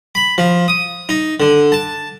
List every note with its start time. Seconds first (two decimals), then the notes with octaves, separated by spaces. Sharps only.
0.15 B5
0.38 F3
0.68 D#6
1.09 D#4
1.40 D3
1.72 A5